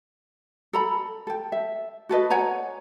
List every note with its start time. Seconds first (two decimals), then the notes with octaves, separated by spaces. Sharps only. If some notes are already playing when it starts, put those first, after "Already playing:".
0.73 A4 A#5 B5
1.27 A4 G5
1.52 E5
2.09 F#4 A4 B4 D#5
2.30 C#5 F#5 G#5 A#5